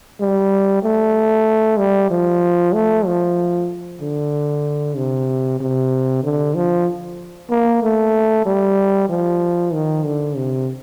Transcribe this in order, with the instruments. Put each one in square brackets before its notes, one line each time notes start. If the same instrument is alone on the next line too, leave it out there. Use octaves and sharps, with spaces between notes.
[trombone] G3
A3
G3
F3
A3
F3
D3
C3
C3
D3
F3
A#3
A3
G3
F3
D#3
D3
C3